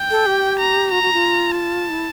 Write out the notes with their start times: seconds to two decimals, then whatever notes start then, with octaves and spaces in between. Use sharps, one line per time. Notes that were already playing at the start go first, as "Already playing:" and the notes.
Already playing: G5
0.11 A4
0.26 G4
0.59 A#5
0.92 F#4 A#5
1.03 F#4
1.13 F4
1.57 A5
1.90 E4